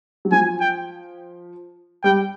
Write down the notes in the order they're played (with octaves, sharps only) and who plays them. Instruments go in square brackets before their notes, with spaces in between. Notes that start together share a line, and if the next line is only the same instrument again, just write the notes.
[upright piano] F#3
[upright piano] F3 [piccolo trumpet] G#5
[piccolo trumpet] G5
[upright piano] G3 [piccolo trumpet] G5